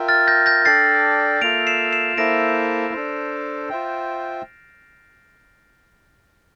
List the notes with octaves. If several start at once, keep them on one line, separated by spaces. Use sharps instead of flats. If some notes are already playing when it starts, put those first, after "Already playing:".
Already playing: F4 A#4 E5 G5
F6 A6
G6 A#6
G6 A#6
D4 A4 D5 G5 A6 C7
A#3 F4 A4 E5 D7 F7
C7 E7
C7 E7
A#3 E4 A4 C5 E5 A#6 D7
D4 A4 C5
F4 C5 E5 G5